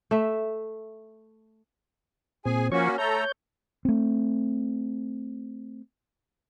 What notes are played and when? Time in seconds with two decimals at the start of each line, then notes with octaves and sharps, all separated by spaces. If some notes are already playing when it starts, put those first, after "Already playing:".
0.11 A3 E5
2.45 A#2 C4 G#4 G#5
2.72 F3 A#3 C#4 F#4 C#5 C#6
2.98 A3 A4 C#5 A#5 G6
3.85 A3 C4